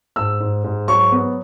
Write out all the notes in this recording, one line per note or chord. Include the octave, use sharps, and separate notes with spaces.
G#2 E6
G#2
G#2
F#3 C#6
B3